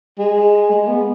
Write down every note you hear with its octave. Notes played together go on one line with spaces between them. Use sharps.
G#3
G#3
B3